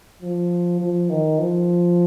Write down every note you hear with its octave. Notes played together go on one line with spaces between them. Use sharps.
F3
F3
D#3
F3